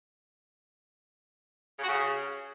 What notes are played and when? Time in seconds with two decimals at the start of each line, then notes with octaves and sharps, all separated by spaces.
1.77 C#3
1.83 F#4
1.88 C#3